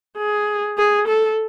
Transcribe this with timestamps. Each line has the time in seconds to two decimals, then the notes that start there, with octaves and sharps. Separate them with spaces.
0.18 G#4
0.78 G#4
1.08 A4